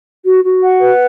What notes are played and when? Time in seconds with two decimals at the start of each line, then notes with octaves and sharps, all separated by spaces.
0.24 F#4
0.44 F#4
0.63 F#5
0.81 B4